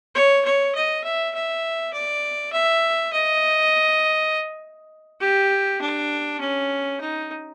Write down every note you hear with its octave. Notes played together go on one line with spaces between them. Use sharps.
C#5
C#5
D#5
E5
E5
D5
E5
D#5
G4
D4
C#4
D#4